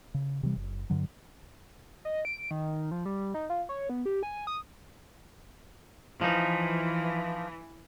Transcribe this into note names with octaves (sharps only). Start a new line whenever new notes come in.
C#3
C3 E3 G3
F#1
G2 D3 F#3
D#5
D7
D#3
F3
G3
D#4
F4
C#5
B3
G4
G#5
D#6
E3 F3 D#4